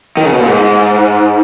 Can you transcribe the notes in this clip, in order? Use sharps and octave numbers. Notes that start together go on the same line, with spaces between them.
D#3
C#3
B2
A#2
G#2